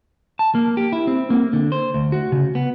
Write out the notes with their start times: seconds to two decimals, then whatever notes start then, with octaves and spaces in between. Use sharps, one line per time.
0.39 A5
0.55 A#3
0.77 G4
0.92 E4
1.07 C4
1.30 A#3
1.53 D3
1.72 C5
1.94 D2
2.12 F#4
2.32 C#3
2.55 B3